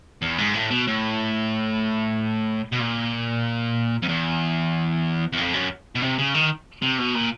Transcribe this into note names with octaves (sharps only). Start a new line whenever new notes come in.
E2
G#2
A2
B2
A2
B2
A#2
F2
E2
E2
F2
F#2
B2
C3
C#3
D#3
C3
B2
A#2